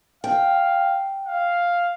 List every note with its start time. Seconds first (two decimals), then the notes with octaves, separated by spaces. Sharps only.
0.24 F5 G5
1.26 F5